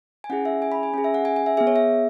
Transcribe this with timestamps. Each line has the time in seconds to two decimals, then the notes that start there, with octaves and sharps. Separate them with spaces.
0.24 G#5
0.30 C#4 E4 G#4 F#5
0.45 E5
0.62 G#5
0.72 B5
0.83 G#5
0.94 C#4 G#4 G#5
1.04 E5
1.14 F#5
1.25 G#5
1.36 G#5
1.46 E5
1.57 B3 G#4 E5
1.67 C#5
1.76 E5